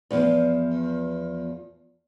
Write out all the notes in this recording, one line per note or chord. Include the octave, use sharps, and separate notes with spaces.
E2 F3 B3